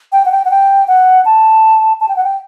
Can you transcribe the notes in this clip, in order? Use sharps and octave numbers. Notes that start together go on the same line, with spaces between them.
G5
F#5
G5
F#5
G5
F#5
A5
A5
G5
F#5
G5